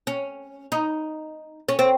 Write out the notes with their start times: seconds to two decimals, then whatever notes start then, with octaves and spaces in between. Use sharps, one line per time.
0.07 C#4
0.72 D#4
1.69 C#4
1.79 C4